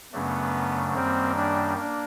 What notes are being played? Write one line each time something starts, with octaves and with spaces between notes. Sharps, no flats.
F#2 C#3 F#3 A3 B3 D4
F#2 D#3 G3 A#3 C4
D4
A#3 D4